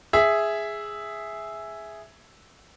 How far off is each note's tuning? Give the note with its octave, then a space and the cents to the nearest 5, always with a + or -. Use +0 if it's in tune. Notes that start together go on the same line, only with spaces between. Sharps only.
G#4 +0 E5 +0